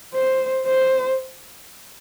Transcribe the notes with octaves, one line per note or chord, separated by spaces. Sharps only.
C5
C5